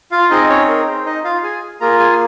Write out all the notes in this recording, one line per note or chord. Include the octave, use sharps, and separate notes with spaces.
F4 F5
C4 D#4 G#4 D#5
C#4 C#5
A#4
C5
D#4 D#5
F4 F5
G#4 G#5
A#3 F4 G#4 A#4 A#5
G#4 G#5